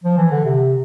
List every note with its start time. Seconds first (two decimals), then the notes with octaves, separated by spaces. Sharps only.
0.04 F3
0.17 E3
0.31 D3
0.45 C3